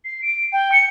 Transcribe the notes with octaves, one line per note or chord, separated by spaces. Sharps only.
C7
D7
G5
C#7